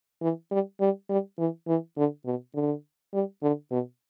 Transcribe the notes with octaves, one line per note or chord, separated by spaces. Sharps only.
E3
G3
G3
G3
E3
E3
D3
B2
D3
G3
D3
B2